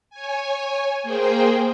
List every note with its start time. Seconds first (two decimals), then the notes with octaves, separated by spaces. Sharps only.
0.10 C#5 G#5
1.03 A#3 G#4 C5 G5